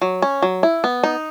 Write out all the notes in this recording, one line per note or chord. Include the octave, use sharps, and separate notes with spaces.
F#3
C#4
F#3
E4
B3
D#4